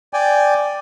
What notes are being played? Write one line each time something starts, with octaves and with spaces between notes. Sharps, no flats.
D5 G5 G#5